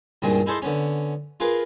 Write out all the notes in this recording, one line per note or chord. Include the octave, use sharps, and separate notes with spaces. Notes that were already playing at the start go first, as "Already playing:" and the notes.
C2 G2 A#2 D#3 G#3 D#6
D#4 E4 G#4 A4 C5 D#5
D3 B3 C#4
F4 G#4 A#4 B4